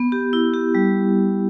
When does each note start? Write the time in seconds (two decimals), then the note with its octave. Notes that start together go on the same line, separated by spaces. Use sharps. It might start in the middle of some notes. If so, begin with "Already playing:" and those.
Already playing: B3
0.12 G4
0.33 E4
0.54 G4
0.75 G3